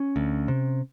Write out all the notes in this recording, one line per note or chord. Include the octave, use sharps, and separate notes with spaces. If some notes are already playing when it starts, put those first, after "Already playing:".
Already playing: C#4
D2
C3